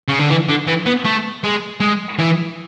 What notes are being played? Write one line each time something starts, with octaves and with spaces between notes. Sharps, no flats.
C#3
D3
E3
D3
E3
B3
A3
G#3
G#3
E3